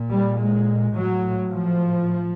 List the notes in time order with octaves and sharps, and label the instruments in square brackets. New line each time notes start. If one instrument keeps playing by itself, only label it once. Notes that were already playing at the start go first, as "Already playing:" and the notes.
Already playing: [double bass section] A#2
G3
G#3
A2 F#3
F3